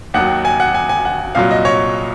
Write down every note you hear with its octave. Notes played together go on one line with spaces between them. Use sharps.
D#2 D#3 F#3 F#5
G#5
F#5
G#5
G#5
F#5
C2 A#2 F#3 F5
D#5
C#5